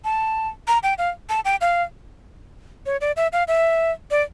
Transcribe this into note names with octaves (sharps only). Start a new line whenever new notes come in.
A5
A#5
G5
F5
A5
G5
F5
C#5
D5
E5
F5
E5
D5